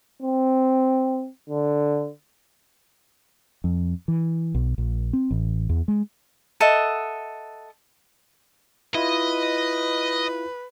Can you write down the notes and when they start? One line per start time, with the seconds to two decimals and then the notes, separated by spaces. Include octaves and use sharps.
0.22 C4
1.49 D3
3.64 F2
4.08 E3
4.54 B1
4.78 A#1
5.13 C4
5.31 A1
5.69 E2
5.88 G#3
6.60 A4 D#5 E5 F#5
8.95 E4 F4 B4 D#5